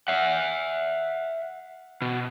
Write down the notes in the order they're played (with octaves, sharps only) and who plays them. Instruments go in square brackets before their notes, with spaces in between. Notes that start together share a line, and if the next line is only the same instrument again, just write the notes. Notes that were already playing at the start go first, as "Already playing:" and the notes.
[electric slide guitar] E5 F#5
B2